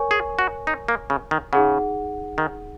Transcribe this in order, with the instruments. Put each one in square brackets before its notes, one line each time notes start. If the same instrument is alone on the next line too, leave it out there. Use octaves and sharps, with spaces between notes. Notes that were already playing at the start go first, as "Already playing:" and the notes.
Already playing: [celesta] A#4 C#5 G#5 C#6
[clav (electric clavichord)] G#4
F#4
D#4
A#3
C#3
D#3
[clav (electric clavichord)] C#3 [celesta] D#4 G#4 F#5
[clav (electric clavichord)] D#3